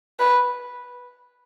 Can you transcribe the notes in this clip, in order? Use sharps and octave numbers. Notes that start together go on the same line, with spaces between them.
B4